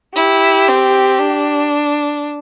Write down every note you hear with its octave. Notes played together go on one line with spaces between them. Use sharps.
E4 G4
C4
D4